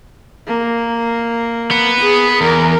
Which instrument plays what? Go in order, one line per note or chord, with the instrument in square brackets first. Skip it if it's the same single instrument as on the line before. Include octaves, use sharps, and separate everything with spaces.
[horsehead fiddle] A#3
[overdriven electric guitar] B3
[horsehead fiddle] G#4
[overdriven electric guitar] E2 [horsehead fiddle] A#4